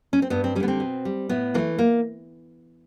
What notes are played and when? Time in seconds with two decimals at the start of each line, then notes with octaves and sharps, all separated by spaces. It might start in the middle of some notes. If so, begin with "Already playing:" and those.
0.13 C#4
0.22 C4
0.30 G2 B3
0.44 C4
0.55 G3 C#4
0.60 D3 B3
0.68 C4
0.80 B2
1.05 G3
1.29 A2 B3
1.54 E3 A#3
1.58 A3
1.78 A#3